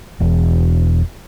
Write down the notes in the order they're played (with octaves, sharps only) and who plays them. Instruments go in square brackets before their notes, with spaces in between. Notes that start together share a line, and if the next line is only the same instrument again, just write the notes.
[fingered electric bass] E1